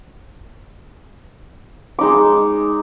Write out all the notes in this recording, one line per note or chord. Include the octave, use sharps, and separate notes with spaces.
G#3 D#4 D6